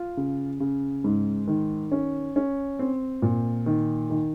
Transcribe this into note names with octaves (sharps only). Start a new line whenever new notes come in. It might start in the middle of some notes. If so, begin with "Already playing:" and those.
Already playing: F4
C#3
C#3
G#2
D#3
C#4
C#4
C4
A#2
D#3
D#3